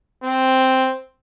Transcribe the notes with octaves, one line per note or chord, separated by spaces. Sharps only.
C4